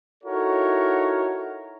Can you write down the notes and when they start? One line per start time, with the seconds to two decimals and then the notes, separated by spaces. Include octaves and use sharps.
0.24 D#4 E4 F#4 A4 A#4 C#5